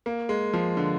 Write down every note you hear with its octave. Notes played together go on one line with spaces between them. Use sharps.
A#3
G#3
F3
D3